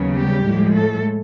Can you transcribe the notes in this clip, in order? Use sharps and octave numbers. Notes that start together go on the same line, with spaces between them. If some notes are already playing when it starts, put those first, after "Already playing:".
Already playing: D#2 C#3 F#3 B3
G3 G4
A2 F3 G#3
A3 A4